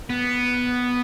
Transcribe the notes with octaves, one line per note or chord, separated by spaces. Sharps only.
B3